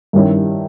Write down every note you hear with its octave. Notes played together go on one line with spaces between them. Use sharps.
G2 D#3 G3 C#4 E4